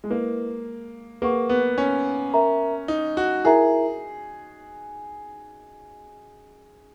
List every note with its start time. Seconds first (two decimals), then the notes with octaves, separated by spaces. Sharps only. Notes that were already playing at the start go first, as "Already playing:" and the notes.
0.04 G#3
0.10 A#3 E4 B4 D#5
1.22 A#3 G#4 B4 F#5 C#6
1.49 B3
1.78 C#4
2.34 A#4 E5 A#5
2.88 D#4
3.17 F#4
3.45 E4 G#4 A#4 E5 A#5